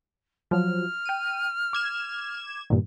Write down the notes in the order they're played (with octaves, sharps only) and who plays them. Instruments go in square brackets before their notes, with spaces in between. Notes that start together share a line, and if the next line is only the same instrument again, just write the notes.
[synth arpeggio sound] F3 F#3 [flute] F6
[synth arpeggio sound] G5 D#7
D6 G#6 E7
G2 A#2 D#3